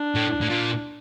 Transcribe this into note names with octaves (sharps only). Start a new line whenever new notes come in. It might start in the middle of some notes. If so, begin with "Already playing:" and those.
Already playing: D4
A2
A2
A#2